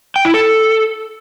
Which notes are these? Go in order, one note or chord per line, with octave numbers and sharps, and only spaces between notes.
G5
E4
A4